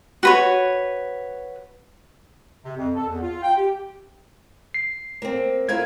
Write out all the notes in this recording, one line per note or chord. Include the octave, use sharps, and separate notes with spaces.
F#4 B4 C#5
C3
F2
A4
E2
F4
G5
G4
C7
A#3 C4
E4 F4 A#4 G#6